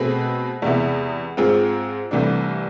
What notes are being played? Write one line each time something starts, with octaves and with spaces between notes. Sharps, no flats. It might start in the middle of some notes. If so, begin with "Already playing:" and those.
Already playing: B2 A3 C4 G#4 B4
E2 C3 G#3 B3 E4
G#2 G#3 C4 F4 G#4
C2 C3 E3 A3 D4